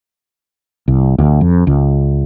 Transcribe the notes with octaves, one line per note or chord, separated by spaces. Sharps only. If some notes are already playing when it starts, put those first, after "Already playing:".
C2
D2
F2
C#2